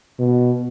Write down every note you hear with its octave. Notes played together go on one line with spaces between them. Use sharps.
B2